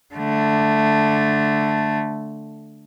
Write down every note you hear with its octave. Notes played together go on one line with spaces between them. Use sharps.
D3 A3